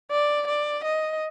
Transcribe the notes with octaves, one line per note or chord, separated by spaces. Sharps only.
D5
D5
D#5